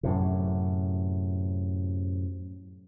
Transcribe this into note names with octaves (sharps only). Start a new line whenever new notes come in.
F#2 A2 C3